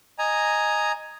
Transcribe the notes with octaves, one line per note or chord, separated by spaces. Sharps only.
D#5 G#5 A#5